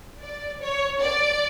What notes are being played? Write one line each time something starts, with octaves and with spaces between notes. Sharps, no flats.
D5
C#5
D5